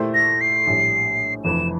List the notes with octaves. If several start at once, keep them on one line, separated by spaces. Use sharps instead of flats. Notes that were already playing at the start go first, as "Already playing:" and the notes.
Already playing: A#2 A3 E4 G4 C5
A#6
C7
A#1 A2 G3
F1 F2 E3 E7